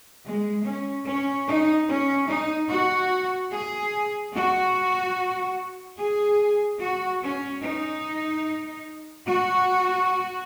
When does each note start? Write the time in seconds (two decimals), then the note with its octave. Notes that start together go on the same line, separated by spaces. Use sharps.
0.25 G#3
0.65 C#4
1.06 C#4
1.47 D#4
1.89 C#4
2.28 D#4
2.70 F#4
3.51 G#4
4.34 F#4
5.98 G#4
6.79 F#4
7.21 C#4
7.61 D#4
9.25 F#4